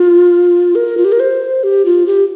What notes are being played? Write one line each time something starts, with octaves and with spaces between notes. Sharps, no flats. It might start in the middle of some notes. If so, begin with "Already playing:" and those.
Already playing: F4
A#4
F4
G4
A#4
C5
G4
F4
G4